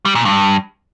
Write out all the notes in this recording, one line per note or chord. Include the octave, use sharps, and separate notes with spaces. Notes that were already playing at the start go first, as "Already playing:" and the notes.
G3
A#2
G2